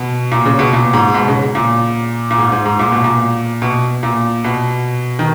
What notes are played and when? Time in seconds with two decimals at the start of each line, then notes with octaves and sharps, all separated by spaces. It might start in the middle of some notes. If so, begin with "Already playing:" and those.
Already playing: B2
0.32 A#2
0.46 C#3
0.59 B2
0.73 A#2
0.93 G#2
1.14 B2
1.28 C#3
1.55 A#2
2.31 A#2
2.38 G#2
2.52 G#2
2.65 G#2
2.79 A#2
2.92 B2
3.04 A#2
3.62 B2
4.03 A#2
4.44 B2
5.19 D#3